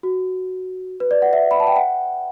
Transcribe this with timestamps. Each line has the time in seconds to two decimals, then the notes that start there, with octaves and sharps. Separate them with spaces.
0.03 F#4
1.00 B4
1.11 D5
1.22 F#5
1.33 E5
1.51 B5
1.60 A5
1.67 G5
1.76 F#5